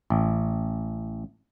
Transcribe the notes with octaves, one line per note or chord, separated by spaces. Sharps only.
A1